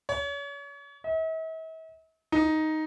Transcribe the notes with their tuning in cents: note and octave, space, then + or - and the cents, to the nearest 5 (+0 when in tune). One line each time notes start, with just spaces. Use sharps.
C#5 +35
E5 -45
D#4 +5